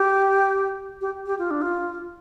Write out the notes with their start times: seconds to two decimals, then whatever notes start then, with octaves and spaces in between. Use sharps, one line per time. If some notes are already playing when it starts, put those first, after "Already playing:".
Already playing: G4
1.01 G4
1.26 G4
1.39 F4
1.51 D4
1.62 F4